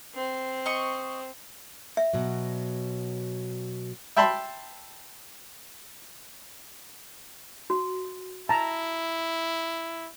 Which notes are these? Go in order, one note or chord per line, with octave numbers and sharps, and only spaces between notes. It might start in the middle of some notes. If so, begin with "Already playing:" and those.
C4
D#5 C#6
E5
B2 F#3
E5 G5 A5 B5 C6
F#4
E4 A5 A#5